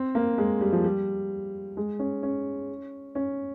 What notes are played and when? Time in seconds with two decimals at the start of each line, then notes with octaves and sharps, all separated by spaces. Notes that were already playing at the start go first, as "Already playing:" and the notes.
Already playing: C4
0.15 A#3
0.38 G#3
0.61 G3
0.73 F3
0.84 G3
1.77 G#3
1.99 C#4
2.23 C#4
3.15 C#4